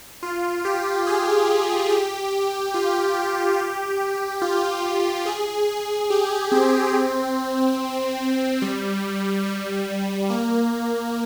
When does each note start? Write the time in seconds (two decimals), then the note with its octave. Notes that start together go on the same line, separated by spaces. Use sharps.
0.23 F4
0.65 G4
1.07 G#4
1.91 G4
2.74 F4
3.59 G4
4.42 F4
5.26 G#4
6.10 G4
6.52 C4
8.62 G3
9.46 G3
10.30 A#3